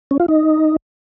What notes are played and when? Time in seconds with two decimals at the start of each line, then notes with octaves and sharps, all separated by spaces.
0.11 C#4
0.20 F4
0.28 D#4